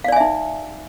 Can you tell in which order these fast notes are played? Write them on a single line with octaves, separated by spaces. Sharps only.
F5 D5 G#5 E5 D#4